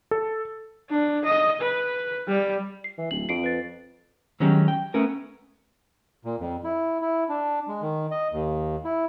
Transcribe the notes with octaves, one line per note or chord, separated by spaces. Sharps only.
A4
D4
D#5
B4
G3
C7
E3
D1 F#7
F2 C7 D7
B4 A6
D#3 F#3 G#3 C#4 F#4 G4
G5
A3 B3 C#4 A#4
A#2
F2
E4
E4
D4
G#3
D#3
D#5
D#2
E4